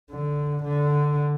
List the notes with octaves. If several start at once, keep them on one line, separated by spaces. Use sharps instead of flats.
D3
D3